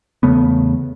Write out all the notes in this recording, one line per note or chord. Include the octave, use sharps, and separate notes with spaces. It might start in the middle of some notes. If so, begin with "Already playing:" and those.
E2 C#3 A3 B3